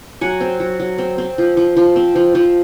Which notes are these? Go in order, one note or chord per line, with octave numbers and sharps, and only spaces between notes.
F#3 F#5 G#5
C4
F#3
F#3
C4
C4
F3
F3
F3
C4
F3
F3